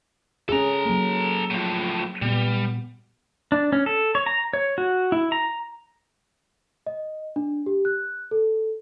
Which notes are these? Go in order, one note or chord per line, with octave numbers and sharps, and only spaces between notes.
C#4 G#4 A4 A#5
F#3 A#3
A2 F3
A#2 G3 B3
D4
C#4
A4
C#5
A#5
C#5
F#4
E4
A#5
D#5
D4
G4
F#6
A4